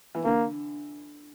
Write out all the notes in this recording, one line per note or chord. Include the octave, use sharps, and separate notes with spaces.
E3
D3 A#3